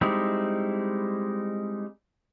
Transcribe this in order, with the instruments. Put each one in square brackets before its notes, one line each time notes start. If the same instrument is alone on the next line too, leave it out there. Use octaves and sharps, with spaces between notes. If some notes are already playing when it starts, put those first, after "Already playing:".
[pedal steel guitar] G3 G#3 C4 D#4 E4